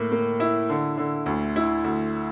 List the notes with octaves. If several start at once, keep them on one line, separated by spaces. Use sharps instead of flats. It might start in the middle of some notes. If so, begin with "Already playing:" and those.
Already playing: A2 A#3
A#3
E4
D3
D3
D2
E4
D2